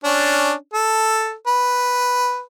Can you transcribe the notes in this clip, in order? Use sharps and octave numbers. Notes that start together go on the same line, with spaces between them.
C#4 D4
A4
B4